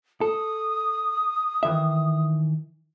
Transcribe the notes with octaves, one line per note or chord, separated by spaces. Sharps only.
A4 D#6
D#3 E3 E5